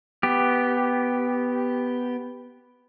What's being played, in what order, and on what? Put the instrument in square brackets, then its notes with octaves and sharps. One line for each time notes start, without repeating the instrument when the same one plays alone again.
[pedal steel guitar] B3 G4